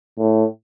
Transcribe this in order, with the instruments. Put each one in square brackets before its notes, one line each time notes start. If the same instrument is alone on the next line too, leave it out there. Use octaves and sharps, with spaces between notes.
[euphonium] A2